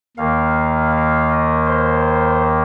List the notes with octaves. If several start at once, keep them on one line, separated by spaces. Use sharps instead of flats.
D#2 D#3 A#3 F5
F5
D#5
C5